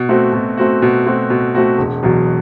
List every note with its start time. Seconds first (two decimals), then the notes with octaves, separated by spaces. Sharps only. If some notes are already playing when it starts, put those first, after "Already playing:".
Already playing: B2
0.09 A3 C4 F#4
0.33 B2
0.58 A3 C4 F#4
0.82 B2
1.06 A3 C4 F#4
1.30 B2
1.55 A3 C4 F#4
1.78 E1
2.03 E2 B2 F#3